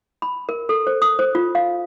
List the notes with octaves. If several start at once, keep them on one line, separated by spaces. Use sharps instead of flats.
B5
A#4
A4
C5
D#6
C5
F4
F5